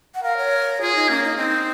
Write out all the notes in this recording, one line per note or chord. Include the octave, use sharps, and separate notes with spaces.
F#5
A#4 F5
C#5
F4 G#4
D#4
A#3 C#4
D#4
C4 D#4